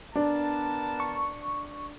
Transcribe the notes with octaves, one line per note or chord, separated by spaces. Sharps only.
B3 D4 A#4 A5
C#6